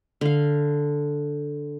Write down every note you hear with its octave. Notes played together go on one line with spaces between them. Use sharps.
D3 F5